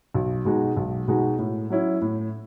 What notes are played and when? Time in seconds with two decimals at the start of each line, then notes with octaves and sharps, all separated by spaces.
0.14 B1
0.45 B2 G#3 D#4 F#4
0.77 B1
1.08 B2 G#3 D#4 F#4
1.39 A2
1.70 F#3 C#4 E4
2.01 A2